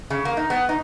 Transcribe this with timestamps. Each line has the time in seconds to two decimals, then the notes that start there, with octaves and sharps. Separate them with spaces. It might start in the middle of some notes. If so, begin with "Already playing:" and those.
0.10 C#3
0.25 A#3
0.37 D#4
0.50 B3
0.69 D#4